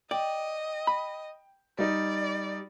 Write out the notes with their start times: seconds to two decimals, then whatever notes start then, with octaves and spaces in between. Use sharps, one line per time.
0.11 D5 D#5 G5
0.87 B5
1.79 G3 D#4 D5